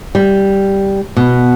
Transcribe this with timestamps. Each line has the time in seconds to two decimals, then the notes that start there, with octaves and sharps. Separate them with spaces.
0.15 G3
1.17 B2